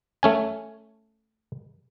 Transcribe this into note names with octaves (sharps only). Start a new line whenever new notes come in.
A3 C#4 G#5